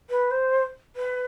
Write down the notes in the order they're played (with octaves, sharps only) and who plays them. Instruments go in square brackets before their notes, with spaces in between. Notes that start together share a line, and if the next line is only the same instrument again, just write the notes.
[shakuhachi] B4
C5
B4